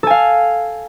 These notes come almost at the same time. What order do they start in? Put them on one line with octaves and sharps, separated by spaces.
A4 G#5 F5